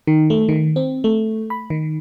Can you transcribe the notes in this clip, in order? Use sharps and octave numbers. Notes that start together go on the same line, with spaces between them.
D#3
A3
D#3
C4
A3
B5
D#3